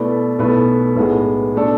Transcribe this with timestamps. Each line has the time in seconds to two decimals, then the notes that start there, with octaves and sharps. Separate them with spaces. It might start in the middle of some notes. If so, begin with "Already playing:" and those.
Already playing: B2 A3 E4 B4 D5
0.39 B1 B2 A3 E4 B4
0.96 B1 A2 G#3 B3
1.55 B2 A3 D4 A4